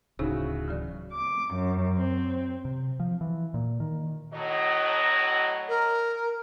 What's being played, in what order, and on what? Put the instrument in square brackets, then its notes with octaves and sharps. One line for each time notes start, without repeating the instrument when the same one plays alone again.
[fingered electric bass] D1 [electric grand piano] C#3 E4 F#4 [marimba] D#4 C5 E6
[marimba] E3 F#3 D5
[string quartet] D6
F#2
C4
[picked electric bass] C3
F3
E3
A#2
D#3
[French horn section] A2 F#3 D#5
[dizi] A#4